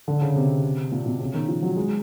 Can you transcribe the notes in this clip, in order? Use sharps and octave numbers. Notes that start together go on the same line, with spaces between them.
D3
C#3
C3
A#2
B2
C#3
D#3
F3
F#3
G#3